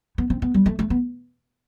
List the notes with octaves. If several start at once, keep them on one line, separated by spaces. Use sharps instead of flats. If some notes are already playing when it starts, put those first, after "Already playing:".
B3
C4
B3
G3
A3
A3
B3